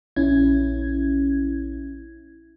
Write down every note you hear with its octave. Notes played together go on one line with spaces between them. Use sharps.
A#1 C#4 E4 G#6